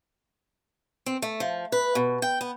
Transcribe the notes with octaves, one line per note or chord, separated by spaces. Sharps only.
C4
A3
F3
B4
B2
G5
B3